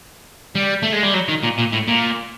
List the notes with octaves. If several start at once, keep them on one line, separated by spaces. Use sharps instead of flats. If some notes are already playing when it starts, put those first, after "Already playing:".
G3
A3
G#3
G3
F#3
D#3
A#2
A#2
A2
A#2